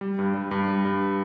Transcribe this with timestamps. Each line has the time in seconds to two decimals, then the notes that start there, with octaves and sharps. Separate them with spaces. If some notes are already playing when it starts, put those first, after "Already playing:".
0.01 G3
0.19 G2
0.34 G3
0.51 G2
0.68 G3
0.85 G2